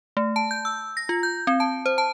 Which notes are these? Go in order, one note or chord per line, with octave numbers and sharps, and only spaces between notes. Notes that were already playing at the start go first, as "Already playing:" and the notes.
A3
A5
G6
E6
A#6
F4
G6
C4
A5
C5
A5